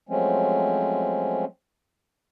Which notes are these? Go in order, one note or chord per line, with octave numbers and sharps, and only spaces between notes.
F3 F#3 G#3 A3 C4 C#4